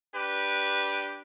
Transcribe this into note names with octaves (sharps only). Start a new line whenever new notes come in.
D4 G4 B4